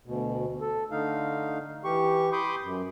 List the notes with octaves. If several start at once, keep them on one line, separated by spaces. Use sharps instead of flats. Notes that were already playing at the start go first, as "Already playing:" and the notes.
D2 B2
A4
D3 A3 D#4 F5
E3 G4 C#6
B5 C6 D6 D#6 G6
F#2